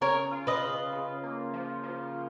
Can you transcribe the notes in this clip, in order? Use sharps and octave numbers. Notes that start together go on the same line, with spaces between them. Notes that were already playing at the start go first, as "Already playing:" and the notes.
C#3 A#4 C#5
F4
B4 D#5
C#3
C#3
A#3
F3
F3